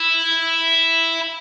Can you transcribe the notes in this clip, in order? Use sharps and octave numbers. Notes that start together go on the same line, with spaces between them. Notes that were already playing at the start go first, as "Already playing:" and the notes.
Already playing: E4